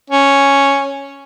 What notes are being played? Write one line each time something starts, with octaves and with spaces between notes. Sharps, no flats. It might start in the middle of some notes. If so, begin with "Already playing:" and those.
C#4